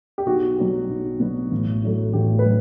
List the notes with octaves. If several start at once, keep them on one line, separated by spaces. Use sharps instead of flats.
G4
B1 F#4
B2 F#3 B3
B1
B2 F#3 B3
A1
A2 F#3 A3
A1 G4
B4
A2 F#3